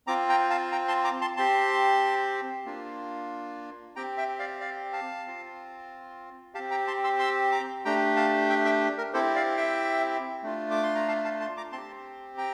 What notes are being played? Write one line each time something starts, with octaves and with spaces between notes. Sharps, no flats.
C4 F4 A#5 D6
G5 A#5
F5 A5
G5 A#5
A5 C6
A#5 D6
A5 C6
C4 G4 A5 C6
A#3 D4 F4
C4 G4 G5 A#5
E5 G5
D5 F5
D5 F5
F5 A5
C4 F4
C4 G4 F5 A5
G5 A#5
A5 C6
C6 E6
C6 E6
A#5 D6
A3 D4 G4 G5 A#5
F5 A5
E5 G5
E5 G5
A#4
C4 E4 G4 A4 C5
D5 F5
E5 G5
A3 D4 F4
D6
C6
A#5
F5 A5
F5 A5
A5 C6
A#5 D6
C4 G4 A5 C6
G5 A#5